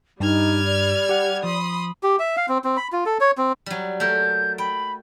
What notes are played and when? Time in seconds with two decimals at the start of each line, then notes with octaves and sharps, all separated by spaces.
0.20 G2 G3 D#4 F6 G#6
0.65 D5
1.09 G4 F#5
1.44 F3 B5 C6 D#6
2.03 G4
2.19 E5
2.37 F5
2.49 C4
2.64 C4
2.77 B5
2.92 F4
3.06 A4
3.21 C#5
3.38 C4
3.66 F#3 G3
4.00 A3 A4 A#4 G6
4.58 G5 B5